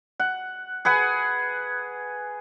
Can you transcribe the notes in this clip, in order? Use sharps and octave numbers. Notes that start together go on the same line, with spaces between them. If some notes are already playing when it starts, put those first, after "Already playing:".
F#5
G#4 B4 F#5 G#5